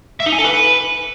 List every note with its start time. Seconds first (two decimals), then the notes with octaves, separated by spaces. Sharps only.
0.20 E5
0.26 D#4
0.33 G#5
0.39 A4
0.45 B4